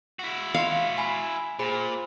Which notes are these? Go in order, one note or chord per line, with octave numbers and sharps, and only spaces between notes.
E4 F#4
F5 C6 C#7
G#5 B5 C7
A#2 G#4 C5 B5